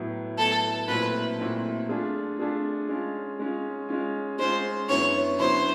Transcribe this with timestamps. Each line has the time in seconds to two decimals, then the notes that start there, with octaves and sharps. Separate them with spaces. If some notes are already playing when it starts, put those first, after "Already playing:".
Already playing: A2 F#3 B3 E4
0.38 A2 F#3 B3 E4 A4
0.88 A#2 F#3 A3 C4 E4 B4
1.39 A#2 F#3 A3 C4 E4
1.89 A3 D4 F4 G#4
2.39 A3 D4 F4 G#4
2.89 G#3 C#4 F4
3.39 G#3 C#4 F4
3.89 G#3 C#4 F4
4.39 G#3 C#4 F4 C5
4.89 F#2 D3 F#3 B3 E4 C#5
5.39 F#2 D3 F#3 B3 E4 C5